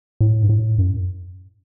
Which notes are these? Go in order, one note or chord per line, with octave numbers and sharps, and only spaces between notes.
A2
G2
A2
F#2